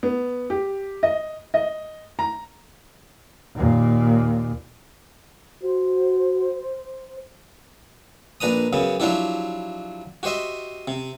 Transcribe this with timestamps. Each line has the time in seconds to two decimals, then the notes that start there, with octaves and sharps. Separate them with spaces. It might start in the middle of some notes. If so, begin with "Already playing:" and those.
0.03 B3
0.50 G4
1.03 D#5
1.54 D#5
2.19 A#5
3.56 D#2 A#2
5.63 F#4 C5
8.41 A#1 D4 B4 A#5 D#6
8.73 F#2 C#3 B3
9.00 F3 F#3 D4 E4 G4
10.23 F#4 G4 C5 D#5 E5
10.88 C3